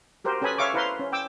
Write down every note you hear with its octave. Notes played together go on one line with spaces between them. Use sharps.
F#4 G4 A#4 C5
C#4 A4 B4 G#5 B5 D#6
C#5 E5 F5 C#6 D6
E4 B4 C5 F5 A#5 C6
C#4
G5 D6 E6